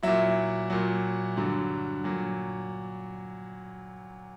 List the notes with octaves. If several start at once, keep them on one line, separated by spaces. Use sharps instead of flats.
A#2 F#3 E4 E5
A#2 F#3
G2 D3 F#3
A#2 F#3